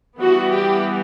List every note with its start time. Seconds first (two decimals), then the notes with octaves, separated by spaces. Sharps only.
0.19 E3 G3 B3 F#4
0.51 G4